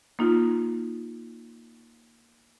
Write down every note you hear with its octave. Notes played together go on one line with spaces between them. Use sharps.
A#3 D#4 F4